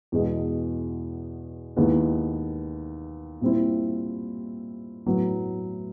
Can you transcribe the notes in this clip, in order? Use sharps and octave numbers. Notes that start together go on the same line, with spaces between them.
E2 B2 G#3
D#2 D#3 G#3 B3 E4
A#2 G3 C4 E4
A2 F#3 B3